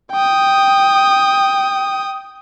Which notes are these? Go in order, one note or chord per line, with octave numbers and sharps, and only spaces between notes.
G5 D#6